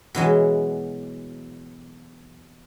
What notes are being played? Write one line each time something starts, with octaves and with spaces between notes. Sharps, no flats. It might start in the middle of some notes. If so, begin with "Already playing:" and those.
B2 E3 F#3 G#3